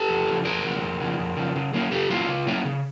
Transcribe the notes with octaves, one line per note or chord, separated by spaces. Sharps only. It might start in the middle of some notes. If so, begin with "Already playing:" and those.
Already playing: G4 A4
F2
C#3 F3
F2 G#4 A#4
C#3 F3
F2
C#3 F3
F2
C#3 F3
C#3
F#3 A#3 C#4 E4
C#3 G4 A4
F#3 A#3 C#4 E4 F4
C#3
F#3 A#3 C#4 E4
C#3